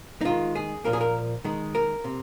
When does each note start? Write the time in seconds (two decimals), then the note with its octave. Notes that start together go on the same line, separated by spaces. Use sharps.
0.21 D#4
0.25 D#3 G#3 F4
0.55 G#4
0.84 A#2 F3 A#3 A#4
0.93 G#4
1.01 A#4
1.44 D#3 G#3
1.75 A#4
2.04 C3